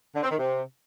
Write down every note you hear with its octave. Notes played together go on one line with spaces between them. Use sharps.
D3
C4
D#3
C3